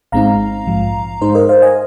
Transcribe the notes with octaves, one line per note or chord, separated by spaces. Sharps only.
G#1 G#2 G#3 C4 D#4 F5 A#5
A#1 G#2 F3
G#2 G#3 D#4 C5
A#4 D#5
C5 F5
D#5 G#5